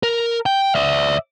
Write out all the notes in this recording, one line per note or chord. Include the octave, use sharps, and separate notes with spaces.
A#4
G5
D5 E5